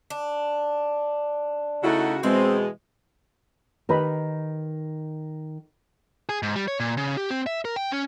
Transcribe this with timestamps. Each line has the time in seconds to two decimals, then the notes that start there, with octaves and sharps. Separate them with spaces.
0.10 D4
1.83 C#3 A3 D#4 E4 F#4
2.23 B2 E3 G#3 C4 E4 G#4
3.89 D#3 D#4 G4 A#4 B4 B5
6.29 G#4
6.43 G#2
6.56 G3
6.68 C#5
6.80 A#2
6.97 C#3
7.17 G4
7.30 C4
7.46 E5
7.65 A#4
7.76 G5
7.92 C#4